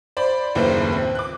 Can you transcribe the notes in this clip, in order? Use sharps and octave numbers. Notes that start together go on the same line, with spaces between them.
C5 D5 B5
F#1 D#2 A2 A#3 B4 C5
C4
D6 F#6